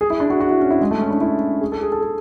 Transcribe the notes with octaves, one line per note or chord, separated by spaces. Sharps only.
G#4
E4
D4
F#4
F#4
E4
C#4
E4
G#3
A3
C#4
D4
E4
G#4
A4
G#4
A4
G#4